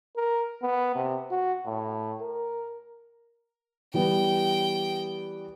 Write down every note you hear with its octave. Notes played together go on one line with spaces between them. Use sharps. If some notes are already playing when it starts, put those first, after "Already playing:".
A#4
B3
C3
F#4
A2
A#4
E3 G3 B3 G5